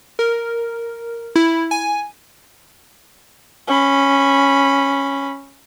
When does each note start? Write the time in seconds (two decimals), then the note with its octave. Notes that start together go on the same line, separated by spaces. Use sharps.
0.19 A#4
1.36 E4
1.71 G#5
3.67 C#4 B5